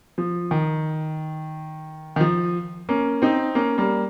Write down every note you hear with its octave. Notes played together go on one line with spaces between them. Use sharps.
F3
D#3
D#3
F3
A#3 C#4
C4 D#4
A#3 C#4
G3 A#3